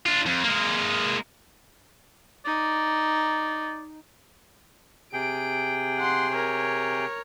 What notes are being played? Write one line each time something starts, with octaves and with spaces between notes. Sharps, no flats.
D4 F4
F2
G#3 A#3
D#4 D5
C3 G#4 G5 D7
F#5 C6
A#4 C#5